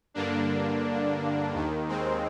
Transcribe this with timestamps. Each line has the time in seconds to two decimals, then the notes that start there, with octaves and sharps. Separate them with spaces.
0.14 G2 D3 A#3 D4
1.53 D#2 D#3
1.88 G#3 C4